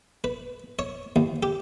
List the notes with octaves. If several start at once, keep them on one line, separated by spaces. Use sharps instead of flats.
B4
C#5
D#2
G4